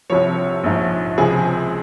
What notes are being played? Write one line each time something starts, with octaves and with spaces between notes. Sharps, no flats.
C2 C3 F3 C#5
A#1 G#2 F3
C#2 C3 F3 G#4